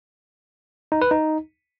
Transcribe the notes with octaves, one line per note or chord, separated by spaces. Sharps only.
D#4
B4
D#4